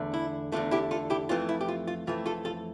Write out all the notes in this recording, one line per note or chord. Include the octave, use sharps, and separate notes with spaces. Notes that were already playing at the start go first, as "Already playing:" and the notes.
Already playing: E2 D3 A3
E4
E2 D3 A3 F4
E4 G4
F4 A4
E4 G4
F2 E3 A3 F4
E4
G4
F4
F4
F2 E3 A3 F4
F4 A4
F4 A4